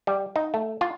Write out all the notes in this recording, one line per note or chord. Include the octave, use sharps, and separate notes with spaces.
G3
D#4
A3
F4